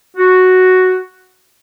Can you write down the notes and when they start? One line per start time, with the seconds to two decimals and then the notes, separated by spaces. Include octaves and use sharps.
0.17 F#4